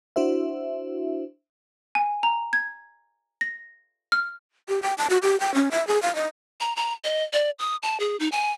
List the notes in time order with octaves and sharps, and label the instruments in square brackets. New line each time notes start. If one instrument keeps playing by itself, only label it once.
[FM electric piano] D4 E4 F#4 C5 E5
[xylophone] G#5
A#5
G#6
A#6
F6
[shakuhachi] G4
G5
A5
F#4
G4
G5
C#4
E5
G#4
F5
D#5
[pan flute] A#5
A#5
D#5
D5
D#6
A5
G#4
D#4
G#5